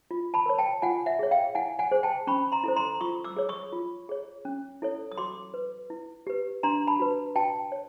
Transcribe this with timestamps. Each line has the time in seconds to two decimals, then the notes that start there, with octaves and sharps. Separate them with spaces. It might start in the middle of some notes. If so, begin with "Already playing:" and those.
0.11 F4
0.34 A5 B5
0.46 A#4 C#5
0.58 G5 A5
0.82 F4 F#5 G#5
1.06 E5 F#5
1.19 G#4 C#5
1.31 F5 G5
1.55 E4 F#5 G#5
1.79 F#5 G#5
1.91 G#4 C5
2.03 G5 A5
2.27 C#4 B5 C#6
2.52 A#5 C6
2.64 E4 A4 C5
2.76 A#5 C6
3.01 F4 C#6 D#6
3.24 D6 E6
3.37 G#4 C#5
3.49 C#6 D#6
3.73 F4
4.09 G#4 C#5
4.45 C#4
4.82 E4 A4 C#5
5.12 D#6
5.17 F#4 C6 D6
5.54 B4
5.90 E4
6.27 G4 B4
6.63 D4 A#5 C6
6.87 A5 B5
7.00 F#4 B4
7.36 F#4 G5 A5
7.72 C#5